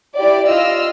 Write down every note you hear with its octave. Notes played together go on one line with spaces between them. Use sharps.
E4 G4 D5
F4 D#5 E6 F6 A#6